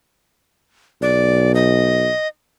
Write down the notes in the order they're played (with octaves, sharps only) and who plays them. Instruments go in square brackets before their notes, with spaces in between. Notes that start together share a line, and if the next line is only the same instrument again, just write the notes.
[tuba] B1 [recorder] D5
[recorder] D#5